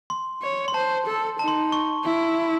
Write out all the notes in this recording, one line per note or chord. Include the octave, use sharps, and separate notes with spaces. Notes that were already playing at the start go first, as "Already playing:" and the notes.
C6
C#5
C6
C5 A5
A4
D#4 A5
C6
C#6
E4